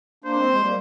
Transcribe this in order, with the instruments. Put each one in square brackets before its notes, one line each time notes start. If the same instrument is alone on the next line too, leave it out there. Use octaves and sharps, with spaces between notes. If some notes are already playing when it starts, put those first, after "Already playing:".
[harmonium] A#3 D4 [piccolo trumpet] C5
[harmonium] G#3 C4
F3 G#3
G3 A#3